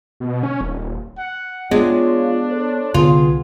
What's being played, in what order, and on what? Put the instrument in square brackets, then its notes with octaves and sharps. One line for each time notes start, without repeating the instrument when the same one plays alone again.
[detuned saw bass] B2
C#4
D#1
[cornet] F#5
[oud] G#3 [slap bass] B3 [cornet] D4 [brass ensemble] F4 C#5
[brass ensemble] A4 C5 C#5
[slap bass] C2 D3 [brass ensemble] B3 [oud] F4 [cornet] G#4